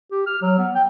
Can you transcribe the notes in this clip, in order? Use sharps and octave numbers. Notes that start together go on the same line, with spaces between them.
G4
F6
F#3
B3
G5